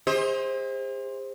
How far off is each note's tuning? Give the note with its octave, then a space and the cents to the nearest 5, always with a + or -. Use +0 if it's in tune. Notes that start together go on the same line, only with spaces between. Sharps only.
G#4 -45 C5 +10 D#5 +40